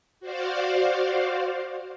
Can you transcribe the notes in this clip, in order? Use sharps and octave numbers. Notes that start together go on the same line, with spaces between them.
F#4 C5 D5 F5